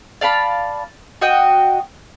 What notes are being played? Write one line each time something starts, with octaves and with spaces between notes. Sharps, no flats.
D5 F5 A5 B5
F#4 D#5 G5